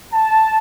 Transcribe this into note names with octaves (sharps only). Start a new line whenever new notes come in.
A5